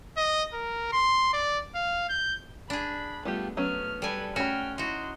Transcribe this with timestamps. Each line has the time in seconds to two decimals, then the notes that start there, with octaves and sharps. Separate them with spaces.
0.17 D#5
0.54 A#4
0.92 C6
1.33 D5
1.75 F5
2.10 G6
2.70 D4 G#4 B5
3.25 G3 A3 B3 F4 G4
3.57 F#3 A3 B3 C#4 F6
4.02 G3 A4 B4 G#5
4.36 A3 C#4 F#4 G5 B5 F6
4.78 D#4 E4 F#4 C6